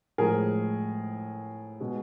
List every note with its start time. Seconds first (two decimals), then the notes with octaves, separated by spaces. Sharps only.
0.18 A2 F3 G#3 G#4 A#4
1.80 B2 G#3